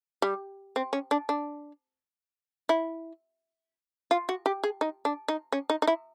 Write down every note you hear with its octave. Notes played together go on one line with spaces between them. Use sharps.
G3
C4
C#4
D4
D4
E4
F4
F#4
G4
G#4
D#4
D4
D#4
C#4
D#4
D#4
E4